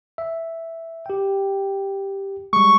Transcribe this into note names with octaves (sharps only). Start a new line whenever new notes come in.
E5
G4 G5
G3 G#3 C#6